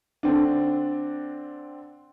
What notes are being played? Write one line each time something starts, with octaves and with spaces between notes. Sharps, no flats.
D3 C4 D4